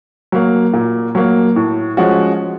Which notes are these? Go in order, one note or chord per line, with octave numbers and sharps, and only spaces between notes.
F#3 A#3
A#2
F#3 A#3
A2
F3 G#3 C#4 F#4